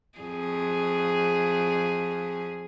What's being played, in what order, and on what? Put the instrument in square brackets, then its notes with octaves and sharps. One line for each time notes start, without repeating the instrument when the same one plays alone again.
[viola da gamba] F2 G#4